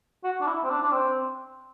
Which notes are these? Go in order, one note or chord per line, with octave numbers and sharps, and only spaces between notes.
F#4
D4
E4
C4
D4
D4
C4